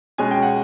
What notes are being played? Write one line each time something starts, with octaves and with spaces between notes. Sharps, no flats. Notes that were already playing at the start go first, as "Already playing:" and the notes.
B2 G#3 C#4 G#5
G5
F#5